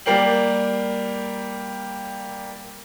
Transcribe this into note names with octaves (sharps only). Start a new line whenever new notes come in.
G3 A#3 G5 C7 F#7